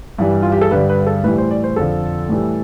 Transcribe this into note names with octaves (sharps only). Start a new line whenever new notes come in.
G2 E3 G3
F4
G4
A4
G2 D3 G3 B4
B4
A4
A2 E3 G3 B4
C5
D5
C5
F2 D3 F3 A4
A2 E3 G3